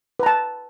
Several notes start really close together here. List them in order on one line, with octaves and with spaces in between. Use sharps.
B4 A#5 A5